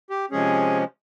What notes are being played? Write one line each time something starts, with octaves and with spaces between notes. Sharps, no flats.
G4
C3 F3 G#3 C#4 G#4